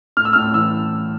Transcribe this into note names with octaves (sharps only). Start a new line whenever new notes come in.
A2 F6
E6
A2 F6
E3 E6